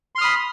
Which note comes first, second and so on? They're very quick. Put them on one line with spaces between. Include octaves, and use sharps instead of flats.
C6 F6 D#6 B5